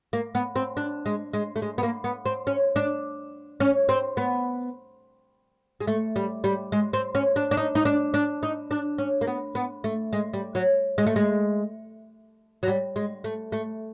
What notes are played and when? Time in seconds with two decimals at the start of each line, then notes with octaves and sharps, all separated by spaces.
0.13 A#3
0.35 B3
0.56 C4
0.77 D4
1.06 G#3
1.34 G#3
1.56 A3
1.62 G#3
1.78 B3
1.83 A#3
2.04 B3
2.26 C4
2.47 C#4
2.76 D4
3.60 C#4
3.89 C4
4.17 B3
5.81 G#3
5.87 A3
6.16 G3
6.44 G3
6.72 G#3
6.93 C4
7.15 C#4
7.36 D4
7.51 D4
7.57 D#4
7.75 D#4
7.85 D4
8.14 D4
8.43 D#4
8.71 D4
8.98 C#4
9.21 A#3
9.27 B3
9.55 B3
9.84 A3
10.13 G#3
10.34 G3
10.55 F#3
10.98 G#3
11.07 A3
11.16 G#3
12.63 F#3
12.68 G3
12.96 G#3
13.24 A3
13.52 A3